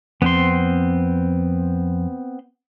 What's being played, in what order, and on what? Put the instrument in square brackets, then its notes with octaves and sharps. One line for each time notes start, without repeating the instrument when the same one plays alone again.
[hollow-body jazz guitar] F2 [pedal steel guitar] B3 C4 C6